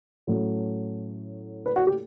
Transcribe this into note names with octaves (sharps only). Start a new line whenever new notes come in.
A2 F#3 A3 C#4
B4
F#4
G4